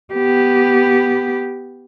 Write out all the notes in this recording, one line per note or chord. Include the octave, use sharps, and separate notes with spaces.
B3 G4